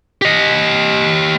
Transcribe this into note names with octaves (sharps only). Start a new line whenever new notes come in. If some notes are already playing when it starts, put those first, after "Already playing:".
G4 D#5